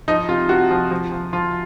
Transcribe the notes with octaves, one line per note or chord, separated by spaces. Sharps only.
F3 D#4
C3 F4
C3 F#4
F3
F3
F3
F3 F4